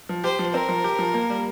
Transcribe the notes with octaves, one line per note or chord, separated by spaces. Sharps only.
F3
G4 C5
F3
C4 A#4
F3
G4
F3
A#3
G3